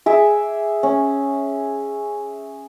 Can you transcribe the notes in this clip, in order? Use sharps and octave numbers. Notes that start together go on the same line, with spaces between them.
G#4 E5 D6
C#4